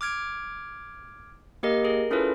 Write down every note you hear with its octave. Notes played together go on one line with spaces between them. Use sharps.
D6 F6 G#6 D7
A#3 G4 A#4 D#5
G#4 A#4
C#4 E4 F4 G#4 A4 B4